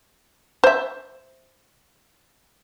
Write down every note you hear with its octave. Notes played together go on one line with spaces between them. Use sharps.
C5 E5